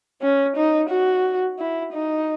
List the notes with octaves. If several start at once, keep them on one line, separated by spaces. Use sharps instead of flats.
C#4
D#4
F#4
E4
D#4